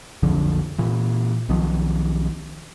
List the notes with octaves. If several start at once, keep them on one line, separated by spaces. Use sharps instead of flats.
B1 F2 D3 F3
A#2 E3
B1 D#3 F3